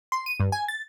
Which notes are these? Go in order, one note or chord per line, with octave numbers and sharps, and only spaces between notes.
C6
D#7
G2
G#5
A6